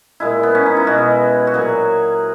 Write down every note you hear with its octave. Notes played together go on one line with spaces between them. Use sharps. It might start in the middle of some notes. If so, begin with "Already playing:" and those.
A#2 G#3 E4
B3
C#4
D#4
E4
B2 G#3 F#4
F#4
A#2 F#3 G#4